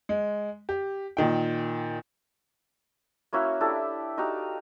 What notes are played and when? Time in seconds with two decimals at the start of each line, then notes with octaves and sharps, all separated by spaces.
0.09 G#3
0.69 G4
1.17 A#2 D#3 G5
3.33 A#3 C#4 E4 F#4
3.60 D4 E4 G4 A4
4.17 D#4 F#4 G4 F5